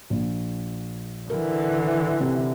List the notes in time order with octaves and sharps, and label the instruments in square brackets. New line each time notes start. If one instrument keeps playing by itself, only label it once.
[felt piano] A#1
[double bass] D3 E3 [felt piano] A#4
[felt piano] C3